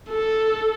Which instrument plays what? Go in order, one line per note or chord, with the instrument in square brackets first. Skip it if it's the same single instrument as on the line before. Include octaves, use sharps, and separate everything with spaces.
[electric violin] A4